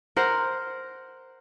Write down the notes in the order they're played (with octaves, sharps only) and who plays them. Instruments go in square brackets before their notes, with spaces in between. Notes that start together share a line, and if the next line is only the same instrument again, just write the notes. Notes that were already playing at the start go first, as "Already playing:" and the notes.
[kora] A#4 C5 F#5